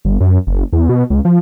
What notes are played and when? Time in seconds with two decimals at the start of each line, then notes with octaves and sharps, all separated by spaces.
0.05 G1
0.21 F#2
0.47 F#1
0.73 E2
0.89 B2
1.10 C#2
1.25 F3